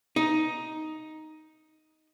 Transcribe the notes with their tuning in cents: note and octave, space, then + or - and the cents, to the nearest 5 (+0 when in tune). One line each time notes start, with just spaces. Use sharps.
D#4 +5